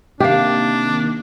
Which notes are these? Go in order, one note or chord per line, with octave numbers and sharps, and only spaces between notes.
C3 D#3 A#3 D4 G4 F5